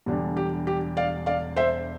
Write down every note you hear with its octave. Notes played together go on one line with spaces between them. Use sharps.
E1 E2 D3 G3 D4
G4
G4
D5 F5
D5 F5
C5 E5